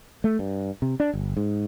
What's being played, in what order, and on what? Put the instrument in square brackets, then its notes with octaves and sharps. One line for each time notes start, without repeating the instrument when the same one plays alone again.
[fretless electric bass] A3
G2
C3
D4
G1
G#2